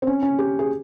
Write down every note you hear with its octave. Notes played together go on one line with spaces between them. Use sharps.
C4
C#4
C#4
G4
G#4